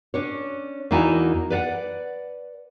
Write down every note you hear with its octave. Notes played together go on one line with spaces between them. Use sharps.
C#4 D4 C#5
E2 A#3 D#4 E4 F#4 G#5
B4 D5 F5 F#5